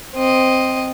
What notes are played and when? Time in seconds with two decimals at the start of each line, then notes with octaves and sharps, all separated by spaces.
0.15 C4 D#5